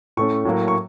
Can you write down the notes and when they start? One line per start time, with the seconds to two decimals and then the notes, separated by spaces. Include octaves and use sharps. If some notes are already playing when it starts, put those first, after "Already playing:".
0.17 A2 A3 C#4 C#6
0.45 A2 F#3 A#3
0.68 C#6